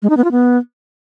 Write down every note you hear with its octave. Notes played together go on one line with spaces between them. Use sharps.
G#3
D#4
B3
F4
B3